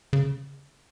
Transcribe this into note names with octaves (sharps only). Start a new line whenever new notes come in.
C#3